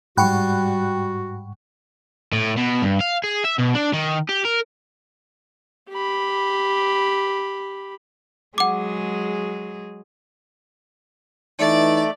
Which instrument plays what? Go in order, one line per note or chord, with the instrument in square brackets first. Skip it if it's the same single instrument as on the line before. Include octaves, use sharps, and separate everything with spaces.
[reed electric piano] G#2 F#5 C#6 [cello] G3 [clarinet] F#4 [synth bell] G5 B5 F#6
[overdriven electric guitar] A2
B2
G2
F5
G#4
E5
B2
D4
D#3
G4
A#4
[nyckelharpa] G4 B5
[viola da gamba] F#3 G#3 G#4 [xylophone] F#5 D6
[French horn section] E3 D#4 [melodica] A3 [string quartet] D5